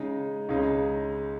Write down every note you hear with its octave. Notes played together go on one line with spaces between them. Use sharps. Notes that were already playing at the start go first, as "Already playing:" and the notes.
Already playing: C#3 G#3 D#4
C#2 C#3 G#3 D#4